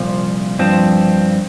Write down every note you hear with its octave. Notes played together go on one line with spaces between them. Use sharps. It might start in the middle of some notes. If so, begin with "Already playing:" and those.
Already playing: C2 A#2 F3
G2 F3 C4